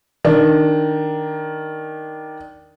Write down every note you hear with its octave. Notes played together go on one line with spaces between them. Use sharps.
D#3 D4